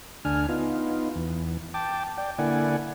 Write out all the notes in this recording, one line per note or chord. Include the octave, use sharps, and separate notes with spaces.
D2 D4 G#5 F6
B3 D#4 F4
E2
G5 A5 D6
D5 G5
D3 A#3 E4 D5 F#5 G#5